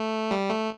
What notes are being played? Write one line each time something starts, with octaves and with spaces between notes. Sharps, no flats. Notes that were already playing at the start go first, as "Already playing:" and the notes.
Already playing: A3
G3
A3